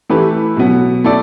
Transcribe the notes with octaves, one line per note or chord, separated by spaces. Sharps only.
E3 A3 E4 G4 B4
B2 F#3 B3
A3 E4 A4 D5